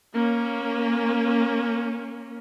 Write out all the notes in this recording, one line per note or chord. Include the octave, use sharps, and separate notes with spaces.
A#3 C#4